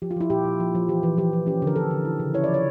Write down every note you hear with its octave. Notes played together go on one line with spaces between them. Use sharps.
F3 G4
F4
F3 E4
A#2 G4
A#2
F3
F3
E3 G4
E3
F3 G4
F3
C#4 G4
D3
A#4
D3 A4
D3
E4
C#3
E4 C#5
D5
F3
C#5